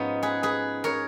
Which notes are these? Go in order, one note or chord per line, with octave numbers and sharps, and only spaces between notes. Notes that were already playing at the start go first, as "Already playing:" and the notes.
Already playing: G#2 F3 B3 C#4 D#4
G#4 B4
G#4 B4
A#4 C#5